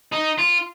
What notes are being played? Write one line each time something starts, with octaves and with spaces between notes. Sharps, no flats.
D#4
F4